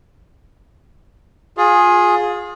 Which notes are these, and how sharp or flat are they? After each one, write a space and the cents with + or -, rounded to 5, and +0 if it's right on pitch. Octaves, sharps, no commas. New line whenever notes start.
F4 +30 G#4 +0